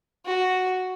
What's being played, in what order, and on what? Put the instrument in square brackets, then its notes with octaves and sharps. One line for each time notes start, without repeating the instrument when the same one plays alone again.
[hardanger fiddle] F#4